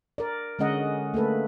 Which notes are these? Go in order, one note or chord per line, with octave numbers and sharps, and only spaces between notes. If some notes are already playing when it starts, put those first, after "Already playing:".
A#4 D5
D3 G#3 C#4 D#5 F#5
A3 A#3 A4 B4